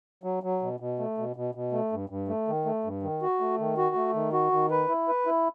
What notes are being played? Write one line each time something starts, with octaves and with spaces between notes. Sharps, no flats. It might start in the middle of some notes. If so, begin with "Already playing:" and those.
F#3
F#3
B2
B2
A3
B2
B2
B2
A3
G2
G2
A3
D#3
A3
G2
D#3
F#4
A3
D#3
F#4
A3
D#3
F#4
D#3
B4
E4
B4
E4